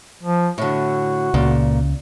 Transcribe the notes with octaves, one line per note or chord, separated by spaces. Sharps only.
F3
A2 D3 F#4
C#2 A#2 C#3